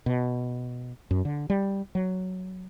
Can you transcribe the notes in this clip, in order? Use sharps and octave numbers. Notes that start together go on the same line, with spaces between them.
B2
F#2
D3
G3
F#3